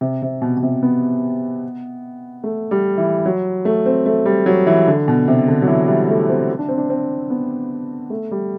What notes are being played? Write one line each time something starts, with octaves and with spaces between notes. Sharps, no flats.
C3
C3
B2
B2
C3
B3
A3
G3
E3
F#3
A3
C4
A3
G3
F#3
E3
D3
B2
C3
D3
F#3
E3
G3
A3
C4
D4
C4
D4
C4
B3
A3
G3